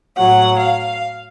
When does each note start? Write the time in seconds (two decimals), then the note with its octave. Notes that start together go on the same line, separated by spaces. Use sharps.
0.17 A2 F#3 F#5
0.59 F5